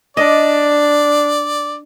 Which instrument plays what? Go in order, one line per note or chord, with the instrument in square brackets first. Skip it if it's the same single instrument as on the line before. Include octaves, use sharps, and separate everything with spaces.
[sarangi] D4 [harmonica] D5 [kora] D#5